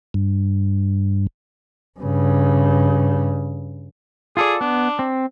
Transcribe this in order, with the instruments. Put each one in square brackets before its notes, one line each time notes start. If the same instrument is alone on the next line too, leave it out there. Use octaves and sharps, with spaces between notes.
[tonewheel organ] G2
[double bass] G2 C#3
[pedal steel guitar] F4 A4 D5 [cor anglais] G#4
[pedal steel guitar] B3 [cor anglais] D4
[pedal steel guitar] C4